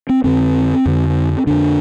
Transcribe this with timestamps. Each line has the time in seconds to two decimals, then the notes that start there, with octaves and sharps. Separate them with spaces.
0.09 C4
0.24 F2 D3 C4
0.86 F2 D3
1.47 F2 D3 D4